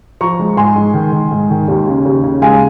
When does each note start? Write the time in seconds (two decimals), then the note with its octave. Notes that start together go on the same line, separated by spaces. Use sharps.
0.21 F3 A#5 C#6
0.39 G#3
0.57 G#2 G#5 C6
0.76 G#3
0.94 D#3
1.12 D#3
1.31 G#2
1.50 D#3
1.68 D#2
1.87 C#3
2.05 D#2
2.24 C#3
2.42 G#3 F5 G#5